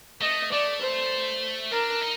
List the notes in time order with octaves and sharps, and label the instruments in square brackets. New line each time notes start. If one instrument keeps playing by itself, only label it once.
[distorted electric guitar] A3 [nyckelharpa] D#5
[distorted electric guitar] A3 [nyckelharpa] D5
[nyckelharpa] C5
[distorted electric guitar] D4 [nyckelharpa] A#4
[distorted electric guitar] D#4